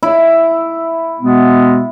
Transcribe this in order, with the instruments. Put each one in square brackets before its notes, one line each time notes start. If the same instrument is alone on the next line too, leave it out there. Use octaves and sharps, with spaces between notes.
[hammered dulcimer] E4
[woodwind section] B2 G#3 B3